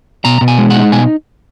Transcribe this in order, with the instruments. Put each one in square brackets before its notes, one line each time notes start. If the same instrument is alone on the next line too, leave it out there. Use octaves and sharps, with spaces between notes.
[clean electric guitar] B2 A#5
B2
G#5
G#3
F#5
D#4
B2 G#5